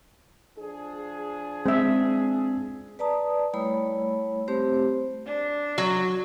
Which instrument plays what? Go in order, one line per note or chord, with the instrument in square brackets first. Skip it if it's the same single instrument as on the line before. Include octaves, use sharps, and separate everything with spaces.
[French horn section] F3 D4 G#4
[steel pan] G#3 E5 [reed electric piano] C4
[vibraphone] B4 D5 A5 A#5 D#6
G3 A3 E4 C#5 B5
A3 C4 G4 C5
[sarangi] D4
[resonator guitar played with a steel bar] F#3